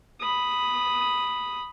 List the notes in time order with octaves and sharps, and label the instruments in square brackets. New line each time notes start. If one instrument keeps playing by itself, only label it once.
[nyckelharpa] B5 D#6